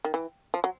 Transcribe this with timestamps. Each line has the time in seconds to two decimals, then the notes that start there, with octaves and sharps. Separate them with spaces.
0.05 D#3
0.14 E3
0.54 F3
0.64 F#3